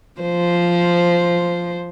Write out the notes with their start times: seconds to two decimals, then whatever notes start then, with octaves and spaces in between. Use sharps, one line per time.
0.21 F3 C5